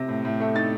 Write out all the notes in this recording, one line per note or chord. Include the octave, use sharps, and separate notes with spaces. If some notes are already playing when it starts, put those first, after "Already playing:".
Already playing: C3 A#6
A2
A2
A3
D#4 A6